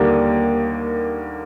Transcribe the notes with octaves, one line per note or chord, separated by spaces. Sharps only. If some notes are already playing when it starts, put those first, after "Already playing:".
Already playing: D#2 D3 G3 A#3 D4